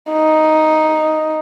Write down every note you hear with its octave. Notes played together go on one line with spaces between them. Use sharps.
D#4